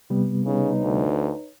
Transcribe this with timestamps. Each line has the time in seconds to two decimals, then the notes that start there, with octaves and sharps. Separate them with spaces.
0.10 C3 G3 B3
0.45 C#3 D#4 B4 C#5
0.80 D2